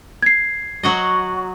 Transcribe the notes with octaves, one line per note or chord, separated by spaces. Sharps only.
G#6 C7
F#3 F#4 D#5